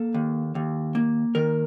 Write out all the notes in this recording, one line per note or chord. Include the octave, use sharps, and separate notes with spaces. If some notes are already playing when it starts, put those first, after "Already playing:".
Already playing: A#3 A4
D#2
D#2
A#3
D#3 A#4